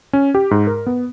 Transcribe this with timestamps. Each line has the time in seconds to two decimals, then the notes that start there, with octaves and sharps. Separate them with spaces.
0.13 C#4
0.35 G4
0.51 G#2
0.67 A#4
0.86 B3